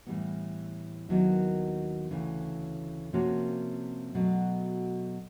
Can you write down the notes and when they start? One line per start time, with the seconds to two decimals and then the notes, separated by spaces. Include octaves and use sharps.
0.06 A2 E3 G3 B3
1.09 D#2 D#3 F#3 B3 E4
2.11 D2 C#3 E3
3.13 C3 F3 A#3 C#4 F#4
4.15 B2 F#3 A3